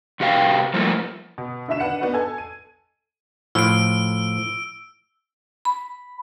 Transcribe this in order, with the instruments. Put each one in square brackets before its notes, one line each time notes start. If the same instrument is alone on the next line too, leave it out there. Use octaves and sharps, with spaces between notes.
[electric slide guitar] C3 F#4 G4 F5 G5
F3 G3 A3 A#3 E4 F4
[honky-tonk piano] B2
D3 E4 F#4 E5 E7
D#3 D4 B4 F#5 C#7
B3 D4 D#4 F#4 B4
A4 G#5 A5 G#6
D#7
[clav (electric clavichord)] A2 F3 [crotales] E6 D7
[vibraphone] B5